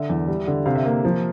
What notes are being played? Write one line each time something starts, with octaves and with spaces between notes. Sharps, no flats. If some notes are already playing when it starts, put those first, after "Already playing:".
Already playing: D3 E5
E2
G3
D3
C3 F5
E5
A#3 F5
F3